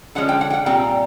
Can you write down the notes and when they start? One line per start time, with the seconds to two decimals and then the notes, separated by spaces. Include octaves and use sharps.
0.15 D3 F3 G#3 C#4 F#5
0.29 G5
0.41 F#5
0.50 G5
0.53 F#5
0.66 A#2 G3 C4 G5